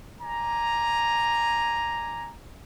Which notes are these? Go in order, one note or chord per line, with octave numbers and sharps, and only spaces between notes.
D5 G#5 A#5